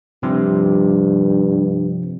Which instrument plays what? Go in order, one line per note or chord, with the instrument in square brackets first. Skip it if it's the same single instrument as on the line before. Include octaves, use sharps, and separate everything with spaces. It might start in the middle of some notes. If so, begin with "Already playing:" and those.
[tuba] G2 [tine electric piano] C3 F3